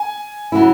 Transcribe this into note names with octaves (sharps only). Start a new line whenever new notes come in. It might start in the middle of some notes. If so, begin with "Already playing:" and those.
Already playing: G#5
C#3 F#3 C#4 E4